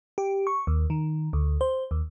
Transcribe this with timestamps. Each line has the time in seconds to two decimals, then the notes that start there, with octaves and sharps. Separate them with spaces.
0.18 G4
0.47 C#6
0.67 D#2
0.90 D#3
1.33 D2
1.61 C5
1.91 D#2